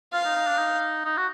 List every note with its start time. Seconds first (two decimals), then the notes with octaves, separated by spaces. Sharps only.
0.13 F4 F5
0.25 D#4
0.35 D#4
0.47 D4
0.59 D#4
1.05 D#4
1.17 F#4